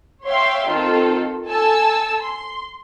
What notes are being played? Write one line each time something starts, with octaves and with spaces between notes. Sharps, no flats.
C#5 E5 F5 G5 C6
D#3 C4 F4 A4
A4 G#5 A5 E6
C6